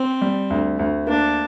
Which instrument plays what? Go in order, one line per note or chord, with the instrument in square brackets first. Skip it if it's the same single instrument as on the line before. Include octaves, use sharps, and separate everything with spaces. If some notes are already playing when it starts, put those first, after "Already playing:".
Already playing: [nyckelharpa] C4
[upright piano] G3
D2
D2
[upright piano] A#3 [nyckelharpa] D4